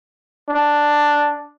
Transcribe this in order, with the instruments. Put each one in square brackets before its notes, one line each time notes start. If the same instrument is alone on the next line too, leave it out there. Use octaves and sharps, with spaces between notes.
[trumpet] D4